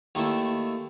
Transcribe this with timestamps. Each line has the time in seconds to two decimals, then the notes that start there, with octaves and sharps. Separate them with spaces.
0.15 D#2 D#3 A3 E4